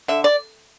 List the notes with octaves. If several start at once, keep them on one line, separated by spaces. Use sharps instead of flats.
D3 E5
D5